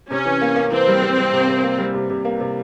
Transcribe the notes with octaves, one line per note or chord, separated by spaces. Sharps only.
C3 C#4
E3
A#3
A#3
E3 C4
G3
G3
G3
C3
C3
A#3
G3
C3
C3
A#3
C3